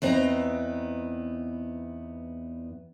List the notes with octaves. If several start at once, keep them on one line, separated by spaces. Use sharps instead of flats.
E2 B3 C4 D#4 F5 A#5